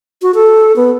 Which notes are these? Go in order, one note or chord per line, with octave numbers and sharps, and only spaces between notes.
F#4
A4
B3